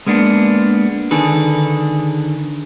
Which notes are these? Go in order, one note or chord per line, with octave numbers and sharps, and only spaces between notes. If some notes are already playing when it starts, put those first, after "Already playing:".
G#3 A#3 B3 D4
D3 D#3 G#4 A4 B4